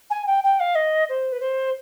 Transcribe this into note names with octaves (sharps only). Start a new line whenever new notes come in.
G#5
G5
G5
F5
D#5
C5
B4
C5